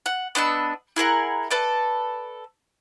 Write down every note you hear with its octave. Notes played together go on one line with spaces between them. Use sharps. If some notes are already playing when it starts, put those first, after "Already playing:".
F#5
B3 D4 D#5 E6
E4 G#4 A#4 F#5
A4 B4 D5